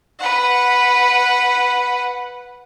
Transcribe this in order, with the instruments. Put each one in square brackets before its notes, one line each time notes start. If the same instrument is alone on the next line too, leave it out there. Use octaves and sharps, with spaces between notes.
[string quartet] B4 F#5